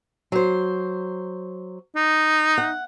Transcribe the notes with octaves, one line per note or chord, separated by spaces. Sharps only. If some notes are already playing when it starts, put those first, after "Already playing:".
F#3 C5
D#4
F#5